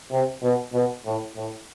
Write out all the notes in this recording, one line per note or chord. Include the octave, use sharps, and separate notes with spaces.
C3
B2
B2
A2
A2